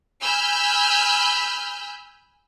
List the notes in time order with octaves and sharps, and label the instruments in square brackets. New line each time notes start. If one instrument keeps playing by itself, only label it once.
[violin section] G#5 B5 E6 F6 G6